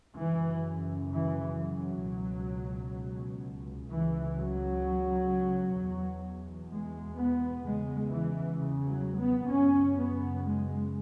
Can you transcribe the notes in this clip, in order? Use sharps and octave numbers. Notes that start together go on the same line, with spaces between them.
F#2 C#3 E3
E3
F#3
C#2 B2
C#2 C#3 E3
F#3
E2 B2
G#3
B3
E2 C#3 G#3
E3
C#3
F#3
B3
F#2 C#3 C#4
B3
G#3